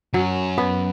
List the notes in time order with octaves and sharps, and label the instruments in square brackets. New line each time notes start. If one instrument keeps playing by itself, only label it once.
[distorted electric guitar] F#2 [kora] F#3
[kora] B3